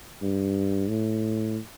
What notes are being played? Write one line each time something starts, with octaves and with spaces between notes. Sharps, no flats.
G2
A2